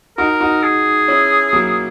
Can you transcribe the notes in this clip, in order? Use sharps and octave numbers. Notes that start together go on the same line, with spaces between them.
D#4 F#4 A#4
D#4 F#4
G#4
C#4 E4
F#3 A#3